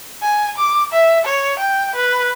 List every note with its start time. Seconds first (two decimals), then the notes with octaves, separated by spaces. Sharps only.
0.22 G#5
0.58 D6
0.92 E5
1.25 C#5
1.59 G5
1.95 B4